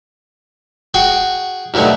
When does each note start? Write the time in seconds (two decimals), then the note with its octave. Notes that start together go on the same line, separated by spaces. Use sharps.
0.94 F#4 G#4 F#5 G5
1.74 D#2 B2 D3 F#3 A3